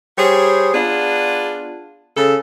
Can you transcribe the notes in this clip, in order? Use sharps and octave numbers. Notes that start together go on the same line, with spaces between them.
G3 G#4 C5 C#5
B3 D4 F4 G#4
C#3 A4